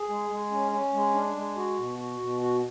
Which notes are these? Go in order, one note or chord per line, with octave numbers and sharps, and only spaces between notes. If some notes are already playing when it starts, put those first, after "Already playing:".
Already playing: G#4
G#3
G#3
C#4
C#4
G#3
D4
G#3
F#4
B2
F#4
B2
F#4